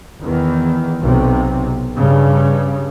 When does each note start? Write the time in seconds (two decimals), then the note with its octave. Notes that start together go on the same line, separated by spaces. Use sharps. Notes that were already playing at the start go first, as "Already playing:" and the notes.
0.22 E2 D#3 E3
1.01 B1 C3
1.94 G2 C#3